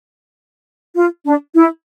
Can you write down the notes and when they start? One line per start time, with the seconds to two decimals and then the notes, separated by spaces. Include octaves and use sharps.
0.95 F4
1.25 D4
1.54 E4